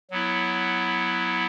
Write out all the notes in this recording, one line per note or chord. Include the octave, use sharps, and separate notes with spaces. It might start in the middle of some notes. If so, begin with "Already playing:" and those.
F#3 B3 E4